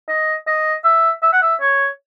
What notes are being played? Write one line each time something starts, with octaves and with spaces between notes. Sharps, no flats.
D#5
D#5
E5
E5
F#5
E5
C#5